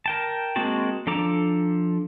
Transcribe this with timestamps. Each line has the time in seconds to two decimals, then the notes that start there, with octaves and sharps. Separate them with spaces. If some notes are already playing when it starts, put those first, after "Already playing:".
0.06 A#4 G5 A5
0.56 G#3 A#3 C4 F#4 A5
1.07 F3 D4 A4 A#5 D6